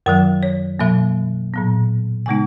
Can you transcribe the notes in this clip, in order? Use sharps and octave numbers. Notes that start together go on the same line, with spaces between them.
F#2 D#3 F#3 A#4
C#5
B2 F#3 A#3 E5
A#2 F#3 B3
C#3 G#3 B3 D#4 G#5